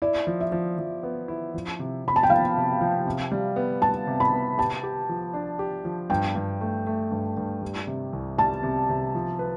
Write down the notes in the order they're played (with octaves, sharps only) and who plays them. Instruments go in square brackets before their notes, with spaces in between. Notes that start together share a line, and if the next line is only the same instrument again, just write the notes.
[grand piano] E4 [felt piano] D5
[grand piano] F3
[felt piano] E5
[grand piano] F3
F3
B3
E4
F3
C3
[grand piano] C3 [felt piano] B5
[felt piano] A5
G5
[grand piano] F3 [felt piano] F5
[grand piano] C3
F3
C3
G3
B3
[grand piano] G3 [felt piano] A5
[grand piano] C3
[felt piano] B5
[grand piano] B3
[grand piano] G4 [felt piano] A5
[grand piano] G4
F3
D4
G4
F3
[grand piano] G2 [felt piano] G5
[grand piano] G2
A3
A3
G2
G2
G3
C3
C2
[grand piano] G3 [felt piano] A5
[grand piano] C3
C3
F3
B4